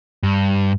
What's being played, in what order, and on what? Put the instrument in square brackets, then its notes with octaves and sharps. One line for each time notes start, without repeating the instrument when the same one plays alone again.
[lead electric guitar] G2